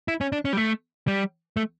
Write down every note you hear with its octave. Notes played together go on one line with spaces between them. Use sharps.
E4
C#4
D4
C#4
G3
A3
G3
A3